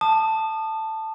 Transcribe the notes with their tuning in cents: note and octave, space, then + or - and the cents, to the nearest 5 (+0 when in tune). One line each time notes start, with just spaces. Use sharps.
A5 +5 D#6 -30